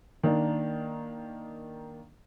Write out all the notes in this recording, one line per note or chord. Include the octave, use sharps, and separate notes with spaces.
D#3 A#3 D4